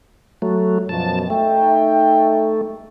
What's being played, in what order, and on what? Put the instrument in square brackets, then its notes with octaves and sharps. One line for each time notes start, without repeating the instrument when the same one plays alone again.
[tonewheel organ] F#3 A3
[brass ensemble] F#2 B2 F3 [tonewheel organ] A5
[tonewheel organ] A3 [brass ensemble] D#4 E5 G5